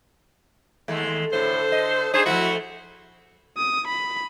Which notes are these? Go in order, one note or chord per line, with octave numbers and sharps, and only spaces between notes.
D#2 G#3 A3
A2 D3 A4 C5
D#5
D4 D#4 G#4 C5
F3 G3 A3 E4 F#4
D#6
B5